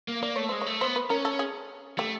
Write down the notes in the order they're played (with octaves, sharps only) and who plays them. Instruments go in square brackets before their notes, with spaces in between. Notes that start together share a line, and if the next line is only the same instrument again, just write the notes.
[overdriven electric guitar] A#3
[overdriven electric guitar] A#3 [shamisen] D5
[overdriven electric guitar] A3 [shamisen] C#5
[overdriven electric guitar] G#3 [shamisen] C5
[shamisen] C#5
[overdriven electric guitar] A3
[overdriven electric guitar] B3 [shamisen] C5
[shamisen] B4
[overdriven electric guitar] C#4 [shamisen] A#4
[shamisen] A4
G#4
[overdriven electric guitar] A3 [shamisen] G4